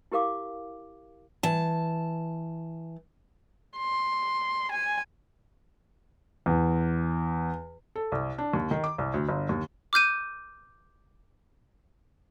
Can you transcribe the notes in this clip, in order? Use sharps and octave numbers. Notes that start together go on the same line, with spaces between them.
E4 G4 A#4 F5 D6
E3 A5
C6
G#5
E2
A4
C2
D4
D#2
D#3
D6
C2
D2
G1
D#2
D6 F6 G6 D#7